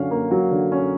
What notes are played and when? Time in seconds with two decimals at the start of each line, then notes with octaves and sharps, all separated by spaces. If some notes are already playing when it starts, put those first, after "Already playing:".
Already playing: D3 F#3 C#4 F5
0.11 A#3
0.31 F#3
0.51 D3
0.72 C#4